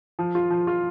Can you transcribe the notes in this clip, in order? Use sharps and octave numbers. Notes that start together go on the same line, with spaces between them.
F3
F4
F3
F4